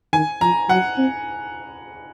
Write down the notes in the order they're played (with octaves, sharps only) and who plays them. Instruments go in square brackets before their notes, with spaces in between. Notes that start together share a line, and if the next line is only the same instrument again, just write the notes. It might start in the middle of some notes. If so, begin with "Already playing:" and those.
[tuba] D#3 [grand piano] G#5
[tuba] F3 [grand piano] A#5
[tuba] F#3 [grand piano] F#5
[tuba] C4